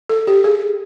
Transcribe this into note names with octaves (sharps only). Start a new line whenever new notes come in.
A4
G4
G#4